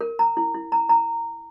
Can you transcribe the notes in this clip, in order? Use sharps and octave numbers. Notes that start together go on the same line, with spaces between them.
A#4
A#5
E4
E4
A#5
A#5